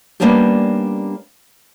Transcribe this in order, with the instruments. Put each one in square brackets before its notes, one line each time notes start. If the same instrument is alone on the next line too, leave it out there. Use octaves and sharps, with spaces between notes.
[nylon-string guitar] G3 A#3 B3 C#4 D4 G4